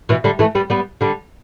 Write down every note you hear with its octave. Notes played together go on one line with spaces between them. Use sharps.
B2 E3
D3 G3
E3 A3
G3 B3
G3 B3
D3 G3